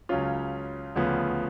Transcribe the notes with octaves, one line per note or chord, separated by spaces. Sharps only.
C#2 C#3 F#3 C#4 F4
D2 C#3 F3 B3